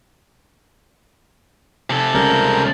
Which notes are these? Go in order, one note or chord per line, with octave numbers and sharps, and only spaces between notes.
C3 A4
C#2 C#3 G3 A#4 G6